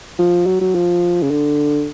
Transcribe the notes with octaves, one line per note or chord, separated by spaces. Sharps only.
F3
F#3
F#3
F3
C#3
D3